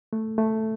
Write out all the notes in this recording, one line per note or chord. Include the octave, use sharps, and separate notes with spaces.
A3
A3